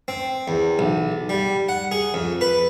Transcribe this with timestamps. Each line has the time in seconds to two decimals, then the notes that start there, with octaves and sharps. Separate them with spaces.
0.08 C4
0.48 E2
0.79 B1
1.29 G3
1.69 F#5
1.91 G#4
2.14 F2
2.41 B4